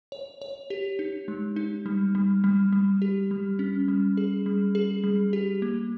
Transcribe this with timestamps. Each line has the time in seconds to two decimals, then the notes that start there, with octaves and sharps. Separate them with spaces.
0.12 C#5
0.42 C#5
0.70 G4
0.99 D#4
1.28 G#3
1.56 D#4
1.86 G3
2.15 G3
2.44 G3
2.72 G3
3.02 G4
3.31 G3
3.59 C#4
3.88 G3
4.17 G#4
4.46 G3
4.75 G#4
5.04 G3
5.33 G4
5.62 A#3